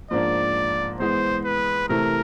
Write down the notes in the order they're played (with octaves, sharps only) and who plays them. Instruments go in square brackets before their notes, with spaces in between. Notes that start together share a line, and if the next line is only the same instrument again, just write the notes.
[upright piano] G#2 F3 A#3 D4 [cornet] D5
[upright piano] E3 G#3 B3 [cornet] C5
[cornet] B4
[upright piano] C3 E3 A3 [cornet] A#4